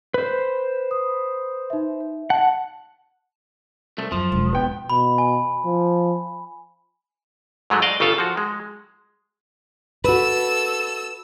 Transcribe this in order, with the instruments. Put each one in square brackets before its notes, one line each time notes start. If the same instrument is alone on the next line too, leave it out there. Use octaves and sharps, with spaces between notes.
[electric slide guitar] B4 C5
[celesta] D#6
D#4 E5
[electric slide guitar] F#5 [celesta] A5
[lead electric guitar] C2 A3
[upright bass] F#2 [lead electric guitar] F3
[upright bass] E1
[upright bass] A1 [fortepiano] B3 G5
[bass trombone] B2 [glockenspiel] B5
[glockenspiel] G#5
[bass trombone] F3
[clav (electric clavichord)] G#2 F#3 G#3 A3
D5 D#5 F5
G1 C#3 F4 A4 F5
F3 F#4
G#3
[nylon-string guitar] F#4 B4 [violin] A4 E6